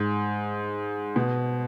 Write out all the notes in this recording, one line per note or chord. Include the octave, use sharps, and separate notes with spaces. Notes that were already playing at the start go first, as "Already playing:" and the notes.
Already playing: G#2
B2